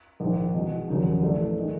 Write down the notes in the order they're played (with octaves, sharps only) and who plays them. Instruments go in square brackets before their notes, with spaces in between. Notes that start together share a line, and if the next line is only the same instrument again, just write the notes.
[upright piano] A#1 G#2 D#3
E2 B2 G#3
F1 D#2 C#3 F#3
A1 A2 E3 A3 D4
D#3 G#3